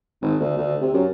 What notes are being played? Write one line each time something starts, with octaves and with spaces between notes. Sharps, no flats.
G#1
D2
D2
C3
F#2